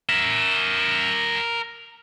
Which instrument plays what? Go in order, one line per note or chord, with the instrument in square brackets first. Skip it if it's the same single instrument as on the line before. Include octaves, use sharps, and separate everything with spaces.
[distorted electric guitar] A#4 E5